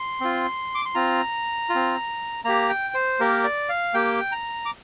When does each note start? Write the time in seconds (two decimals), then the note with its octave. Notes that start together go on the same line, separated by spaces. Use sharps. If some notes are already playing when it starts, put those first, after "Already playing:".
Already playing: C6
0.21 C4 F4
0.75 D6
0.85 C6
0.95 C4 F4 A#5
1.69 F4
1.75 C4
2.45 A#3 G4 A#5
2.69 G5
2.94 C5
3.20 A#3 G4 A#4
3.44 D5
3.69 F5
3.94 A#3 G4 G5
4.32 A#5
4.66 D6